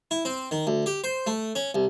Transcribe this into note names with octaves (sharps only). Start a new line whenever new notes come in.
E4
C4
D#3
D2
G4
C5
A3
C#4
C2